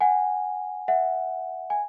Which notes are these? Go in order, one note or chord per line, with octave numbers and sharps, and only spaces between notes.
F#5 G#5
E5 F#5
G#5